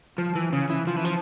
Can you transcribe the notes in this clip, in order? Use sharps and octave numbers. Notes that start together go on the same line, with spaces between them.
F3
E3
C#3
E3
F3
E3
F3